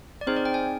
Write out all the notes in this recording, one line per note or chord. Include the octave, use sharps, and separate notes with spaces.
D5
C4 D#4 G#4 C5
D5
G5
G#5